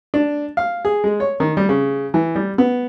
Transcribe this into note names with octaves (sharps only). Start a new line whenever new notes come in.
D4
F5
G#4
G#3
C#5
D#3
G3
C#3
E3
G3
B3